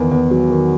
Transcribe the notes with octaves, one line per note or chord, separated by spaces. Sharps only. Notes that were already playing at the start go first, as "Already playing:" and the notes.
Already playing: E2 D#3
E2
F#3
D#3